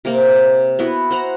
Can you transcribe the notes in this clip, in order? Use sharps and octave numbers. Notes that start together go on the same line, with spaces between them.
C3 A#3 C4
B3 E4 F#4 B4
C5 F#5 A#5